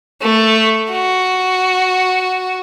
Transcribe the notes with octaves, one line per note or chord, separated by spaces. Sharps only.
A3
F#4